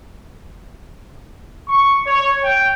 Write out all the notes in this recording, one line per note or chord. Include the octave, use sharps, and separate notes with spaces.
C#6
C#5
G5